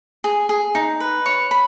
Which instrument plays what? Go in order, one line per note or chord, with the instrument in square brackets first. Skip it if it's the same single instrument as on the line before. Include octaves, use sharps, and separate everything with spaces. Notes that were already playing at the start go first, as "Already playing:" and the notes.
[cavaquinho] G#4
G#4
D#4
B4
C#5
B5